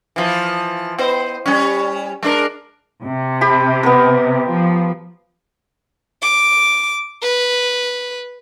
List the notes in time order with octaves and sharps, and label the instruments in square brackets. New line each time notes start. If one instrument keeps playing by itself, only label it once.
[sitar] E3 F3
B3 C5 D#5
G3 C#4
G#3 D4 A#4
[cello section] C3
[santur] G4 B5
B3 A#4
[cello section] F3
[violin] D6
B4